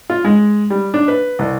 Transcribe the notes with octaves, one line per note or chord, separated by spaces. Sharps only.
F4
G#3
G3
D4
B4
C2